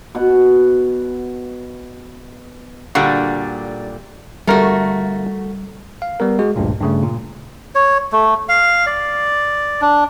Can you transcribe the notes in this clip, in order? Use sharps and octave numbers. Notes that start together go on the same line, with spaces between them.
B2 F#5
A#2 D3 G3 F#4
G1 G3 A3 F#4 A#4
F5
G3 B3 A#4
G#3 F#4 G#4
A1 D2 G2 A#2
G2 C#3 A3
A#2
C#5
A3
F5
D5
D4